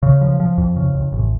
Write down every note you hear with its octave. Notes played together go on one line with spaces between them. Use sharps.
C#3
F3
F3
F2
C#3
F2
A1